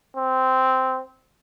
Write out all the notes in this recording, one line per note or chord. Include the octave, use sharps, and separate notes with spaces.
C4